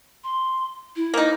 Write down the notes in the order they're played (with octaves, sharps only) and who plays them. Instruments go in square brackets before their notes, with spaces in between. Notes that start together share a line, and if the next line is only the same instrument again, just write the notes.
[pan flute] C6
E4
[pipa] A#3 D#4